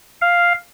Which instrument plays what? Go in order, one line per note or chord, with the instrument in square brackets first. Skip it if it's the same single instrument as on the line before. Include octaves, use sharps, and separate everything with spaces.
[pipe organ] F5